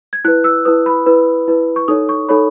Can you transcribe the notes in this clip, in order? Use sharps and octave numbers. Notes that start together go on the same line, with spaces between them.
G#6
E4 B4 F#6
E6
E4 B4 D#6
B5
E4 B4
E4 B4
C#6
D#4 A4 C#5 D#6
C#6
D#4 A4 C#5 B5